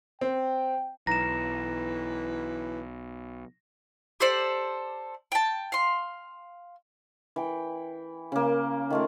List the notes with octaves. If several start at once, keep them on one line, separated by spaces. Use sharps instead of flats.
C4 G5
B1 E3 A#5 A#6 E7
G4 A4 C5 D5
G5 A5
F5 C6
E3 G5
C#3 A#3
D#3 A3 F4